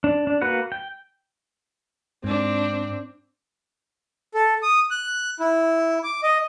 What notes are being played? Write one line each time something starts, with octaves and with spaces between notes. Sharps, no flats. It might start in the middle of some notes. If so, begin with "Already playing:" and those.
D4
D4
A#3 F#4 B4 F#5
G5
G#2 C4 D4
A4
D#6
F#6
E4
D6
D#5